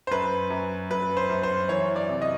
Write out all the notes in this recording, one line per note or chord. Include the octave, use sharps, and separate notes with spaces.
C5
F#2 B4
F#2
F#2 B4
C5
F#2
C5
E3 C#5
D5
C3
D#5